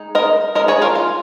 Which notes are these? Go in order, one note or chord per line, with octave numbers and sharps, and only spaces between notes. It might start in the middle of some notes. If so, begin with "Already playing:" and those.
Already playing: G#3 D#4
A#4 D#5
G#3 C#4 A#4 D#5
G#4 C#5
F4 A#4
F4